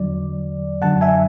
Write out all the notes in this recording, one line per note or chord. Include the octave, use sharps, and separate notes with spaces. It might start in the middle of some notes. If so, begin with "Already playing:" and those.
Already playing: E2 D3 F#3 D5
F#2 D3 F#3 F#5 A5
E5 G#5